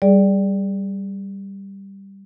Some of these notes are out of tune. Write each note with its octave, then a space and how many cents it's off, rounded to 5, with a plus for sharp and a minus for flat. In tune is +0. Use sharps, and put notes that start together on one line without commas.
G3 +0 G#4 +0 D5 +0